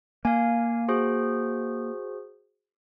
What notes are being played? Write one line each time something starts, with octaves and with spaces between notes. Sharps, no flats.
A#3 F5 G#5
F#4 G#4 C5